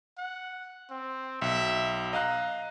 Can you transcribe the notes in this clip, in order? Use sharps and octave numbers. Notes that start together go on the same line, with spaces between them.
F#5
C4
B1 E5
D#5 F5 A#5 F#6